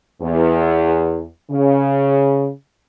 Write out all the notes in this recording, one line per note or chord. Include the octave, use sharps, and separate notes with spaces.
E2
C#3